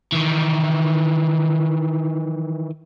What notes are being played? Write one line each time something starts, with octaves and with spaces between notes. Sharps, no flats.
D#3 E3